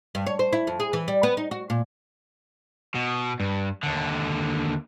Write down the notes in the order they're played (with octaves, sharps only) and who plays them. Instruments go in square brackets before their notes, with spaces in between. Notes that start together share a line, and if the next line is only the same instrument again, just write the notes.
[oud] G2
C#5
C5
E4
F2
G#4
E3
G3
B3
D#4
F#4
A#2
[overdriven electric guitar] B2
G2
D#2 D3